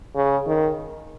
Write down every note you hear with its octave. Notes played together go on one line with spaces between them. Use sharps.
C#3
D#3